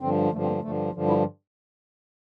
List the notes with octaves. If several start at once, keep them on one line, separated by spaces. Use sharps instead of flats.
G2 D3 F3 C4
G2 D3 F3 A3
C4
A#3
G2 D3 F3 A3
G2 D3 F3
E4